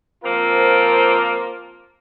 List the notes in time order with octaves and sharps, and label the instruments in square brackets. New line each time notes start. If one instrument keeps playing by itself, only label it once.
[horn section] F3 A#3 C4 F4 A#4